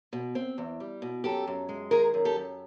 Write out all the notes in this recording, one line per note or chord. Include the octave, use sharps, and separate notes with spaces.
B2
C4
E2
G3
B2
F#2 G4 A4
F#2
G#3
D#3 G#4 A#4
F#2
G4 A4
F#2